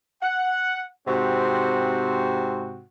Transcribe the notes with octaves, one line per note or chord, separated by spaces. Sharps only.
F#5
G#2 C3 C4 F#4